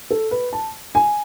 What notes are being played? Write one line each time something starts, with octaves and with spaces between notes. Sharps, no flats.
A4
B4
A5
G#5